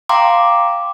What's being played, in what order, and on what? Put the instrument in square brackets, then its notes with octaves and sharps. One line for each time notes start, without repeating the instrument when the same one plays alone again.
[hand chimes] F5 G5 A#5 C6 D6